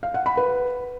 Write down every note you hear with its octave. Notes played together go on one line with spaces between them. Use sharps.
F5
F#5
B5
B4